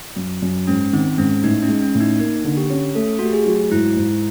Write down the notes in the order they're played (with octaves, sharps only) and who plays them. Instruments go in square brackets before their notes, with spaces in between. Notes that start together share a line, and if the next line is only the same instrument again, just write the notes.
[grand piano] F#2
F#2
[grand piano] G#2 [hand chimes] C#4
[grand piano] D#3 [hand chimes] C4
[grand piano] G#2 [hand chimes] C#4
[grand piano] A2 [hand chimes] D#4
[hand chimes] C#4
[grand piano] G#3
[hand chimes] C#4
[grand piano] A2
[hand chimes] D#4
[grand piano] A#3 [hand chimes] D#4
[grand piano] D3
[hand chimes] G4
[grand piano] C#4
[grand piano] A3 [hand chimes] A4
[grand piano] A3 [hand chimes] F#4
[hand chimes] G4
G#4
[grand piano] F#3
[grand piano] G#2 [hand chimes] E4
[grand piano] G#2